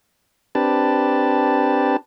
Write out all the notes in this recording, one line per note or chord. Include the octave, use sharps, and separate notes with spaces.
C4 D4 G4 B4 A5